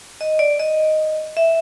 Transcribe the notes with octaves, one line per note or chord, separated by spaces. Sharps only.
D#5
D5
D#5
E5